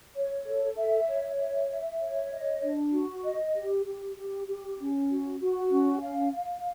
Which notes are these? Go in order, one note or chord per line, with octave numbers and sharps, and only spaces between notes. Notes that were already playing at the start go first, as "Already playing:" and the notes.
C#5
A4
E5
C#5
E5
E5
C#5
D#5
D4
F#4
D#5
G4
G4
G4
G4
C#4
F#4
F#4
C#4
F5
F5